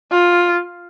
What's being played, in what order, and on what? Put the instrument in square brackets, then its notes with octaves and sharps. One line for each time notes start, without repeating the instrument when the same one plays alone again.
[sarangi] F4